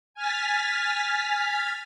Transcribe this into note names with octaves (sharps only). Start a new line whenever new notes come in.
G#5 F6 A6 B6